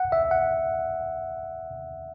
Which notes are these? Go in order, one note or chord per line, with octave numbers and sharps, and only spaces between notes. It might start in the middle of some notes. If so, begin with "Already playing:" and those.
Already playing: F#5
E5
F#5